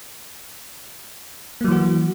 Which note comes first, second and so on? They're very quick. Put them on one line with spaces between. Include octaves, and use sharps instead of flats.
A#3 F#3 E3 F#4